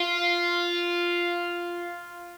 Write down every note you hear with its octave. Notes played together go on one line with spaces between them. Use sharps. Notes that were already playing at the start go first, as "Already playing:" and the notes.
Already playing: F4